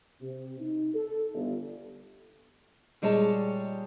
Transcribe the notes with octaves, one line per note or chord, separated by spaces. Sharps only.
C3
D#4
A4
G1
A#2 G3 G#3 C#5 A5